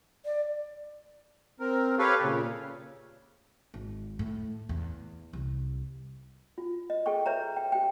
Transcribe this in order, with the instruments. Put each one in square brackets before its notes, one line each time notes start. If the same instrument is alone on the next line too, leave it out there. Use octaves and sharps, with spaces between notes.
[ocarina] D5
[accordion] C4 A#4
G4 A4 B4 C#5 F5
A#2 C#3
[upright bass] G#1
A2
E2
C2
[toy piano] F4
D#5
G#4 A4 D#5 G5 C#6
B4 C#5 E5 A#5
G5
G4 G5